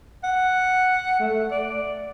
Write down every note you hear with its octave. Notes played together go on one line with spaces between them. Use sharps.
F#5
A3
D5